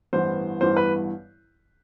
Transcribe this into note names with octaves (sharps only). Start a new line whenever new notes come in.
A1 G2 E3 B3 C5
A1 G2 E3 B3 C5
B4